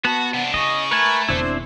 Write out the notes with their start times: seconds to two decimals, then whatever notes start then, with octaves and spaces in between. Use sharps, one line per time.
0.05 B3 F#4 A5
0.33 C3 D4 F#5
0.54 C#3 E4 D#5 C#6
0.91 A3 A#4 B4 G#5
1.29 E1 D#3 C4 D4 E4 C5